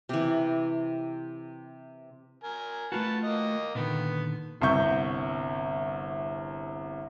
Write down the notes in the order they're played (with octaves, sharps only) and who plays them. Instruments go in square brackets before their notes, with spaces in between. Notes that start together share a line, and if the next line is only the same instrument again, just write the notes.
[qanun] C3 E3
[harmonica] A#4 G#5
[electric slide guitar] A3 F4 F#4 [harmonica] B4 A5
[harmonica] A#3 D#5
[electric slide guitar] A#2 D3 D#3 [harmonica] B3
[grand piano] G1 C2 E5 C#6 G6